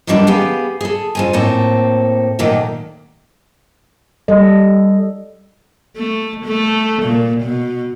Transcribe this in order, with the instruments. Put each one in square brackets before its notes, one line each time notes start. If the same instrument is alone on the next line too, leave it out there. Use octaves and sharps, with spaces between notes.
[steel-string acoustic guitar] D#3 E3 F#3 G3 D4 A4
B3 G4 G#4 F5
G#4 A4
F2 F4 G#5
A2 A#3 C4 A4
A#2 D#3 F#3 A3 A#3
[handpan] G3 A4 D#5
[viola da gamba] A3
A3
A#2
B2